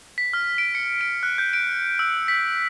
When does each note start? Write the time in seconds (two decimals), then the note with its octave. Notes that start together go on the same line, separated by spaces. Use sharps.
0.18 B6
0.33 F6
0.58 D7
0.75 C#7
1.01 D7
1.23 F#6
1.38 G6
1.53 D7
1.99 E6
2.28 B6